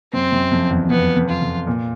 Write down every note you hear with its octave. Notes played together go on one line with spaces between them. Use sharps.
F#2 C4
F#2
F2
E2
F2 B3
F2
F4
F2
A#2